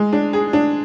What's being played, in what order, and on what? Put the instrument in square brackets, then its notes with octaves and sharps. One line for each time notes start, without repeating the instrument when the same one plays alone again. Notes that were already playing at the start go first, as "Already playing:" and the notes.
Already playing: [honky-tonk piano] G#3
D4
G#4
D4